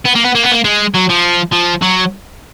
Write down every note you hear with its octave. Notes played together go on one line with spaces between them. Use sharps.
B3
A#3
B3
A#3
B3
A#3
G#3
F#3
F3
F3
F#3